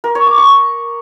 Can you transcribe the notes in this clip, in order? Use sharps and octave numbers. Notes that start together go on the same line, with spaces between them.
A#4
C#5
D6
C#6